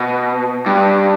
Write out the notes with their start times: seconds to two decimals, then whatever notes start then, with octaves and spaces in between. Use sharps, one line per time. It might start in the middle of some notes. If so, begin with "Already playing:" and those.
Already playing: B2
0.66 G2